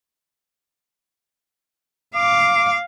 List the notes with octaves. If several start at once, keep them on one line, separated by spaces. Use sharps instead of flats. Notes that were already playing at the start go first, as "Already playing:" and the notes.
F5 D6